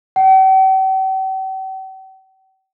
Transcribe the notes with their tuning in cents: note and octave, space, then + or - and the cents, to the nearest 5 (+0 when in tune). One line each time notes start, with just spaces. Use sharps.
G5 -45